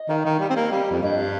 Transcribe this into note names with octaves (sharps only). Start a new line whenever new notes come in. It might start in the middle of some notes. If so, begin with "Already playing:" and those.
Already playing: D#5
D#3 F5
D#3
G3
C4
A#3
G3
F2
G2 D#5
F5